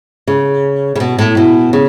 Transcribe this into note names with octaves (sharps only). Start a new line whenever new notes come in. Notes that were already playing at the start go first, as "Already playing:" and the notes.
C#3
C#3
B2
A2
B2
C#3